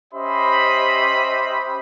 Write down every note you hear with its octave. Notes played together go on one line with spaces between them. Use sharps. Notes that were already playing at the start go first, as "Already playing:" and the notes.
C#4 G4 C5 D#5 E5 B5